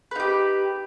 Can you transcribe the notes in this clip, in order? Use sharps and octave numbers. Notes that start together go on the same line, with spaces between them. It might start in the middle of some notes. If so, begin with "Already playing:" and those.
D#4 G4 B4